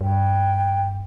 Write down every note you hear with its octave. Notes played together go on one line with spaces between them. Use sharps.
G2 G5